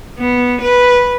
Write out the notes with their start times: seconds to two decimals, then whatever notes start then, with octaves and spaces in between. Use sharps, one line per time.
0.19 B3
0.62 B4